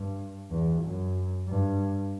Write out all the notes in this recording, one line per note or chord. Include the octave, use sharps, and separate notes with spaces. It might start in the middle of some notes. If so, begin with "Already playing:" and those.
Already playing: G2
E2
F#2
G2